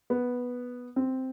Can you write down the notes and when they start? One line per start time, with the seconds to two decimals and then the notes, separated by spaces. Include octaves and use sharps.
0.10 B3
0.96 C4